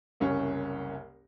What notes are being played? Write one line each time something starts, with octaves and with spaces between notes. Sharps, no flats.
F#1 C2 C#4